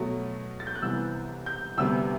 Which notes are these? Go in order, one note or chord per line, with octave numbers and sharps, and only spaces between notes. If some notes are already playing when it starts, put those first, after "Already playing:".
Already playing: B2 F#3 A3
A6
G6
F#6
C2 C3 E3 B3 E6
G6
D2 C3 G3 B3 E6